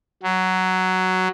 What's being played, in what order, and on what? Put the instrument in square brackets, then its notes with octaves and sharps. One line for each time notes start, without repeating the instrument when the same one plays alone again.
[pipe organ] F#3